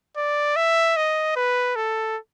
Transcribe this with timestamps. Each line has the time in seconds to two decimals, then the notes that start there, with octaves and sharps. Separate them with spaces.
0.17 D5
0.56 E5
0.97 D#5
1.36 B4
1.76 A4